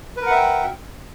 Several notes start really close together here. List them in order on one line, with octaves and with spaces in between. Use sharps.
B4 A#4 F#5 E5 G5